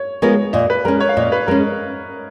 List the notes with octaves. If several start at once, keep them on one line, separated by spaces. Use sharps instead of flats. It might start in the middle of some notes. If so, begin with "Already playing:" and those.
Already playing: C#5
G#3 B3 F4 A#4 C#5
A#2 D#5
B4
G#3 C#4 A#4
C#5
F5
A#2 D#5
B4
G#3 C#4 A#4